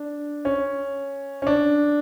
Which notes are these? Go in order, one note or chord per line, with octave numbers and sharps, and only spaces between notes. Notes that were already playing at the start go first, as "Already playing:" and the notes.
Already playing: D4
C#4
C#4
D4